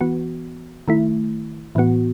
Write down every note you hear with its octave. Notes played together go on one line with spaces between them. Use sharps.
E3 B3 F#4
D#3 A3 E4
A2 E3 B3 F#4